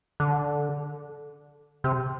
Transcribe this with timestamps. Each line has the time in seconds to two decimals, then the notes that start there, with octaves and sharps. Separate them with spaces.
0.20 D3
1.84 C3